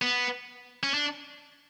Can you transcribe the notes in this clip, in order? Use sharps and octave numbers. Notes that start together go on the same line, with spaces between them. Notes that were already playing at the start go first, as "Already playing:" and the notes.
B3
C#4
D4